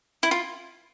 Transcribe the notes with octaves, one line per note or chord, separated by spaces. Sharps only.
E4
F4